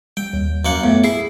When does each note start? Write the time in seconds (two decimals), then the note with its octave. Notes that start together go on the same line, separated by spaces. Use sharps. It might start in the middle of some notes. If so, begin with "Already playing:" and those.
0.17 G3 G5
0.33 D#2
0.65 F#2 A#3 F#5
0.84 A2 A3 B3
1.04 E4 G#4 C7